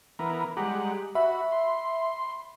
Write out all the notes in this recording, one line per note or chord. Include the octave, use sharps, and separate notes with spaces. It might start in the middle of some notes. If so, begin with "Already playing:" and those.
E3 B3 A#4
G3 G#3 G4 F#5 A#5
F#4 E5 B5
C6